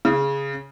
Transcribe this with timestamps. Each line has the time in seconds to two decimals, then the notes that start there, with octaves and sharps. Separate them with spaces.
0.05 C#3